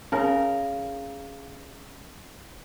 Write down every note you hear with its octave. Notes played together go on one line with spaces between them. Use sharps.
C#3 A#4